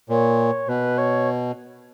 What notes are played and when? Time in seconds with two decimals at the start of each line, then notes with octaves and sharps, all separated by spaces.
0.09 A#2 C#5
0.68 B2 B4
0.98 C#5